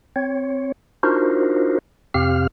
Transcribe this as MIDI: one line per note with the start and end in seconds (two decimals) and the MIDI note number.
0.16 0.72 60
0.16 0.72 73
1.03 1.78 62
1.03 1.78 63
1.03 1.78 65
1.03 1.78 66
1.03 1.78 70
1.03 1.78 72
2.14 2.47 41
2.14 2.47 48
2.14 2.47 60
2.14 2.47 67
2.14 2.47 77
2.14 2.47 89